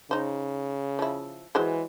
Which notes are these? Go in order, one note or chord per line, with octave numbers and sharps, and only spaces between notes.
C#3 D#4 C5
F3 E4
E3 F#3 G#3 C5